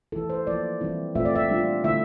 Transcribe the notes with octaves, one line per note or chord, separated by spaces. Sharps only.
E3 A3 E4 A4
C5
F3 A#3 E4 D5
E3 G3 C4 E4
A#2 A3 C4 F4 E5
D5
E5
G3 D4 F4
D3 A3 E4 E5